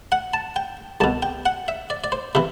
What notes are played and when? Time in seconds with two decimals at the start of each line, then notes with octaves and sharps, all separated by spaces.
0.12 F#5
0.34 A5
0.56 G5
1.00 C2 B2 A5
1.23 G5
1.46 F#5
1.68 E5
1.90 D5
2.04 D5
2.12 C5
2.35 C3 E3 E5